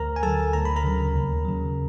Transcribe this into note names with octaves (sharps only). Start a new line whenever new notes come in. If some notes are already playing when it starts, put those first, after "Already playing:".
Already playing: D2 A#4 A#5
G#5
D3 F#3 A4 A5
D2 A#5
B5
A#4 A#5
C#3 F#3
D#2
C#3 F#3